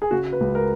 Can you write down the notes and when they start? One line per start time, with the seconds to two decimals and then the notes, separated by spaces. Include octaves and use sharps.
0.02 G#4
0.11 C#3 F#4
0.32 B4
0.41 C#2
0.55 A#4